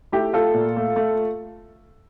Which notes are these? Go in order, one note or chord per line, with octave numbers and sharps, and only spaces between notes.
A3 E4 G4
A3 F4 A4
A#2
A3
A3